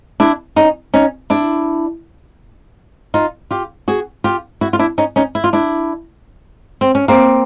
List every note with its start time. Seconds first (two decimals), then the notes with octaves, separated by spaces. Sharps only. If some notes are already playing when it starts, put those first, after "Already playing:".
0.20 D4 E4
0.56 C#4 D#4
0.94 C#4 D#4
1.30 D4 E4
3.14 D#4 F4
3.51 F4 G4
3.88 F#4 G#4
4.24 F4 G4
4.61 E4 F#4
4.73 F4
4.79 D4 E4
4.98 C#4 D#4
5.16 C#4 D#4
5.35 E4
5.44 F4
5.53 D4 E4
6.81 C4
6.95 C#4
7.08 A#3 C4